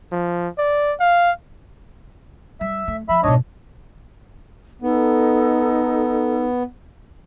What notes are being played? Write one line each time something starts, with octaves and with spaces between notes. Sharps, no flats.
F3
D5
F5
G3 E5
A3
F3 E5 B5
G#2 B2 D4 C#5 D#5
B3 D#4 A4